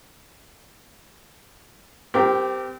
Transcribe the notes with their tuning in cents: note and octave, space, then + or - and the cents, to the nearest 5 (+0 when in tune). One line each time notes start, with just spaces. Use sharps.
C4 -30 G4 +0 A#4 -10